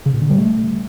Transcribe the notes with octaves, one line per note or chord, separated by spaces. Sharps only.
C#3
A#2
D3
G3
A3